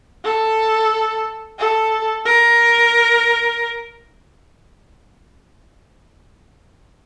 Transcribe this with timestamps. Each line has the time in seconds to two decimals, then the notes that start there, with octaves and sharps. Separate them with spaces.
0.24 A4
1.59 A4
2.25 A#4